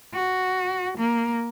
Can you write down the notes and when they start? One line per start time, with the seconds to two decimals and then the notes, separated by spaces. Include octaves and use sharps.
0.13 F#4
0.98 A#3